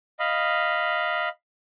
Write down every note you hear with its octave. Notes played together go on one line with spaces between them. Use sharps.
D#5 F5 B5